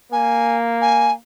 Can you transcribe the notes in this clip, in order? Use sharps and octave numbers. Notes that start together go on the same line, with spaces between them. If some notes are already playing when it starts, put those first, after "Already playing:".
A#3 G#5
G#5